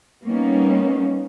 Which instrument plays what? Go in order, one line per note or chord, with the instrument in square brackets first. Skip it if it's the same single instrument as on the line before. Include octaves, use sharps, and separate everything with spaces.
[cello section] G3 A#3 B3 C#4 D#4